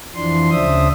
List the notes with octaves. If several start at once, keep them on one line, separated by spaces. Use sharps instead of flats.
F2 E3 F3 D4 C6
D2 C#3 D4 C5 E5 D#6